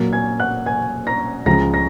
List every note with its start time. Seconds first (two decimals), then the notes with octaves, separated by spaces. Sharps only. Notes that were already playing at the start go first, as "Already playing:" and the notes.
Already playing: A#2 F#3 A#3
0.13 G#5 G#6
0.40 F#5 F#6
0.66 G#5 G#6
1.07 A#5 A#6
1.46 C#2 C#3 F3 A#5 A#6
1.73 A#5 A#6